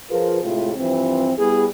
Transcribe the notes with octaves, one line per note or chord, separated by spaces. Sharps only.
F3 F4 G#4 A#4 B4
A2 C3 G#3 F4
G2 E3 F3 C4
G3 B3 E4 G#4